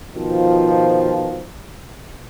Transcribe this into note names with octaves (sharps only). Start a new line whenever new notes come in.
B2 D#3 F3